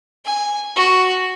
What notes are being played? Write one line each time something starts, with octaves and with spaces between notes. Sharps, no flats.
G#5
F#4